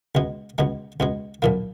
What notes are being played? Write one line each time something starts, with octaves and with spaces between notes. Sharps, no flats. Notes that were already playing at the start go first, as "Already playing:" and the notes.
C#2 B2 G#3
C#2 B2 G#3
C#2 B2 G#3
B1 A#2 F3 A#3